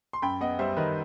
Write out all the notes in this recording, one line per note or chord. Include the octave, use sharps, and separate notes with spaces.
C6
F#2 G5 B5
B3 D#5 F#5
G3 C5 E5
D#3 B4 D#5